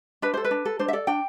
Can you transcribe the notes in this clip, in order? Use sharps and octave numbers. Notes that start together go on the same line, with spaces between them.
D4 B4
A4 C5
B4
D4
A4
D4 C5
E5
A4 D5
D4 G5